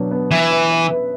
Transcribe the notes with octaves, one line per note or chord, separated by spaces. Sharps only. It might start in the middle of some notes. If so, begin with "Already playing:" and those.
Already playing: B2 F#3 B3 D4
B3
E3 E5
E5
E5
B4